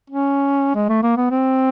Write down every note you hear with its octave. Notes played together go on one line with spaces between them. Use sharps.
C#4
G#3
A3
A#3
B3
C4